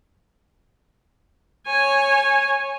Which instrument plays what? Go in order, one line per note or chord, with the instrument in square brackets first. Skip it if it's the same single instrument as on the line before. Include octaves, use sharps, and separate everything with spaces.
[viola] C#5 G#5